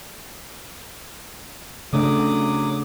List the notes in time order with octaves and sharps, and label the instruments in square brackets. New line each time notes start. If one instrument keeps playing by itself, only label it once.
[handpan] C#3 A3 D4 [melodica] F#3 D6 D#6